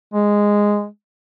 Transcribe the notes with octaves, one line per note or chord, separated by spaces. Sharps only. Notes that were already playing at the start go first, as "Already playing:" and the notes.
G#3